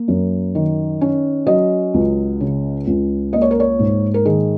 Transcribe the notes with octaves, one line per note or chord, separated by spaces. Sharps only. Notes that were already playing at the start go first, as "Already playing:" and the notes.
Already playing: A#3
F#2
D#3
C#4
F#3 D#5
C#2
C#3
C#2
A#3 D#5
C#5
A#4
C#5
G#2
A#4
D#3 G#4